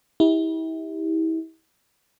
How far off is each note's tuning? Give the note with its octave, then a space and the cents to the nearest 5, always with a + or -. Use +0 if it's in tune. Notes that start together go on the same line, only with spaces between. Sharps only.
E4 -35 G4 +15